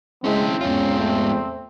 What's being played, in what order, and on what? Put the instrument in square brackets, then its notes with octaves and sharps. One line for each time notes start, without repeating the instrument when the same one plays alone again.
[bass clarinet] C#3 [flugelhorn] G#3 [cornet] C4 [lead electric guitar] C#4 E4
[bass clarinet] E2 [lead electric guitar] G#2 F4 [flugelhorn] C#4
[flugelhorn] A3